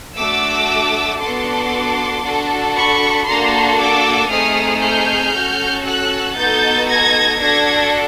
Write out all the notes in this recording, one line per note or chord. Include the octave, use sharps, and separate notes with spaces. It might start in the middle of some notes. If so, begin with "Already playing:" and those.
A3 D4 F#4 D6 E6
B3 D4 F#4 A4 C6 D6
D4 F#4 A4
B5 C#6
A#3 D4 F#4 A4 A#5 C6
D6 E6
A3 C4 D#4 G#4 D#6 F6
F6 G6
C#4 F#4 A4
E6 F#6
B3 D#4 F#4 A4 G6 A6
G#6 A#6
D4 F#4 A4 G#6 A#6